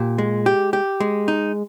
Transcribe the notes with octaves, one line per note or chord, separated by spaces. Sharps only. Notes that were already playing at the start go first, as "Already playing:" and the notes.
Already playing: A#2 G4
G#3
G4
G4
G#3
D#4